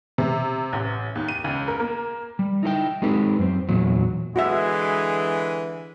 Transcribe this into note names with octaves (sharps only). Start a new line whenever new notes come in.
C3
A1
D#2
D#7
C#2
A#4
A#3
G3
D#4 E4 A4 G5
G#3 C4 D#4 G4 A4 B4
F#2 C4
E2 A#2 F#3
D3 E3 G#3 F#4 E5